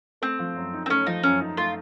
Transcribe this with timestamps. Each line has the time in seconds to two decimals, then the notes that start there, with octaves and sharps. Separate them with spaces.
0.22 A3 C4
0.39 F3
0.56 F#2
0.73 D#4
0.86 C4
0.90 A3 C#4
1.06 F3 D#4
1.23 F#2 C#4
1.40 D#4
1.57 A3 F4